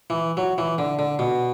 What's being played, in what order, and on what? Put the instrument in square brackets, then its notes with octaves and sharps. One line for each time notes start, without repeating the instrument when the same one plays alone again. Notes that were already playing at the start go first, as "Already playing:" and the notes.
[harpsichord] E3
F#3
E3
D3
D3
B2